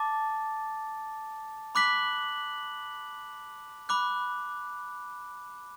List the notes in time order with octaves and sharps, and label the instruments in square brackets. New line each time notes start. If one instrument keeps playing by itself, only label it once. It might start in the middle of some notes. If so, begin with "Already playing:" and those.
Already playing: [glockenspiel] A5 D6 A6
B5 D6 F#6 B6 F#7
B5 D6 F#6